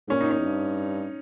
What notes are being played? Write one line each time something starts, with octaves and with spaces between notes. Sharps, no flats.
G#2
A#2 C#4
D#4
C#4
E2
G2